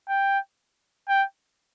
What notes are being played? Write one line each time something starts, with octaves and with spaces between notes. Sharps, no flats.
G5
G5